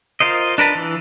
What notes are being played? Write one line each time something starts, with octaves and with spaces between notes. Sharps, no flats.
F4 A#4 C5 D#5
D4 A#4 B4 A5
E3